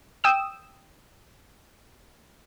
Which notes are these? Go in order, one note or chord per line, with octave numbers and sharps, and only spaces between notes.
G5 D#6 E6 E7